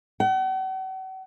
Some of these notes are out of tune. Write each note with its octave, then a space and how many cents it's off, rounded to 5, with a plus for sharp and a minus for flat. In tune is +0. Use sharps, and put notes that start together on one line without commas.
F#5 +45